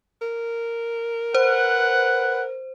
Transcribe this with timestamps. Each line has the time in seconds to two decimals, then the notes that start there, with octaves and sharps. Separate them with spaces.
0.22 A#4
1.34 B4 C5 F#5